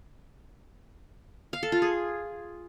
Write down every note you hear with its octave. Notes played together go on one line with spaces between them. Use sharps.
F5
A4
F4
G#4